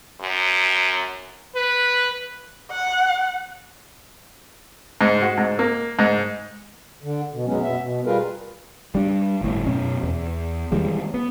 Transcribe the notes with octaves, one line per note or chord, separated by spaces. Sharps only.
F#2
B4
F#5
G#2
F#4
G#2
A#3
G#2
D3
B2
F#2 F#3 G#3 B3 C#4
B2 B3 E5
B2
G3 F4 G#4 A#4 B4
G3 D4
G1 A2
F#2 B2 C#4
E2
D#3 E3 G3 G#3
B3